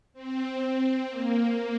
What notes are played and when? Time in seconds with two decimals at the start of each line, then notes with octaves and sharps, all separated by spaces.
0.13 C4
0.61 C4
1.08 A#3